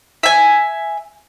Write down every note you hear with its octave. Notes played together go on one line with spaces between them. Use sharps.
E5 G#5